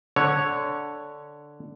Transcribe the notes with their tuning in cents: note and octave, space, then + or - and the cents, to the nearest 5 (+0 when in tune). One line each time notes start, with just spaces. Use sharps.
D3 +0 C#5 +0